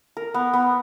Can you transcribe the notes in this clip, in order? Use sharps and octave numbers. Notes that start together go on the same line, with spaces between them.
A#4
B3
B3